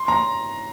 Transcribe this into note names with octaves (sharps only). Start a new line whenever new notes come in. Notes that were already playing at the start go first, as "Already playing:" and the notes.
Already playing: C6
A#5